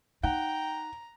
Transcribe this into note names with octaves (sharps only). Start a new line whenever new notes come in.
D#4 F#5 G5 A#5